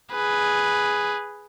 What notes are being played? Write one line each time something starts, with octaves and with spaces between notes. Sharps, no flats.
G#4 B4